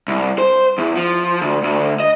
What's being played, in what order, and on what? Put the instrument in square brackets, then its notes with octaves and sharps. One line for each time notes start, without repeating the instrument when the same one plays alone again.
[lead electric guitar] C2
C5
E2
F3
D2
D2
D#5